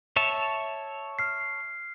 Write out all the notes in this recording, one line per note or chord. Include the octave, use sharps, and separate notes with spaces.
C#5 E5 A5
F6 C7